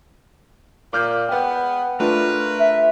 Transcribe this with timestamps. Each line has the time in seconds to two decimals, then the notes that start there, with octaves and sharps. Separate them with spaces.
0.93 A#2 D6 F6 G6
1.29 G#3 B3 F#5 G5
2.00 A3 D4 F4 A#4 B4
2.59 E5